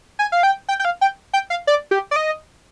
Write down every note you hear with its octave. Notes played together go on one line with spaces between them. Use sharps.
G#5
F5
G5
G5
G5
F5
G5
G5
F5
D5
G4
D5
D#5